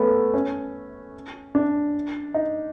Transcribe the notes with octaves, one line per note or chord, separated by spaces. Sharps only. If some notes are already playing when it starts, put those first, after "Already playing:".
Already playing: A3 B3 C#4
C#4
D4
D#4